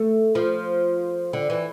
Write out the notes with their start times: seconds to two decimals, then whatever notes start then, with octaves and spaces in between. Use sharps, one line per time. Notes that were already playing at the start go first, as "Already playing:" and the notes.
Already playing: A3
0.35 F3
1.33 D3
1.50 E3